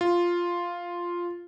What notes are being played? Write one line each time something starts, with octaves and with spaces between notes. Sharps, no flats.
F4